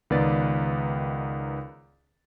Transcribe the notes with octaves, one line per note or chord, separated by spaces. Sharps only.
C#2 D#3 B3 B4 D5 A6